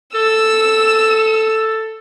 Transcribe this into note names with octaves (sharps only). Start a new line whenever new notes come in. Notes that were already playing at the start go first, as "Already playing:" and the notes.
A4 E6